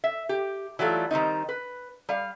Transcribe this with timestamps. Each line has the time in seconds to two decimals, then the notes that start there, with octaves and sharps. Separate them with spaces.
0.04 E5
0.29 G4
0.79 E3 F#3 G3 A3 F4
1.11 D#3 G3 C4 D#4
1.49 B4
2.09 G3 F5